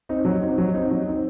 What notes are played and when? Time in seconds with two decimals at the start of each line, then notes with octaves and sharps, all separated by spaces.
0.09 C4 D#4
0.25 F#3
0.42 C4 D#4
0.58 F#3
0.74 C4 D#4
0.91 F#3
1.07 C4 D#4